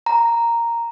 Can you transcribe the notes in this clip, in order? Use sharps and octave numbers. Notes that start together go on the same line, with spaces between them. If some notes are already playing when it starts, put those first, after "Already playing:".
A#5